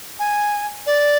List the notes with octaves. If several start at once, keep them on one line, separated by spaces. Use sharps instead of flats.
G#5
D5